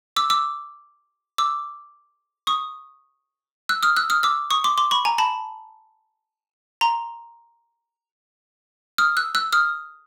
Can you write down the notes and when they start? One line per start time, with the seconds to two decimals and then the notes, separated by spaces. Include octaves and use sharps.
0.16 D6 E6
0.30 D6 E6
1.38 D6 E6
2.47 C#6 D#6
3.69 E6 F#6
3.83 D#6 F6
3.97 E6 F#6
4.10 D#6 F6
4.23 D6 E6
4.51 C#6 D#6
4.64 C6 D6
4.78 C6 D6
4.91 B5 C#6
5.05 G#5 A#5
5.18 A5 B5
6.81 A#5 C6
8.98 D#6 F6
9.17 E6 F#6
9.35 E6 F#6
9.53 D#6 F6